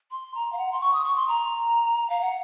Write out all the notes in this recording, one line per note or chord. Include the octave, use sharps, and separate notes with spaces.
C6
A#5
F5
F#5
C6
C#6
D#6
C#6
C6
A#5
F5
F#5